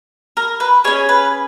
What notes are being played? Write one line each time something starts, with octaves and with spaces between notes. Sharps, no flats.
A#4
B4
C#4 G#4 C#5
B4